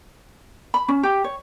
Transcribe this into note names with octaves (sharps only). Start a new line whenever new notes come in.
B5
C#4
G4
C#5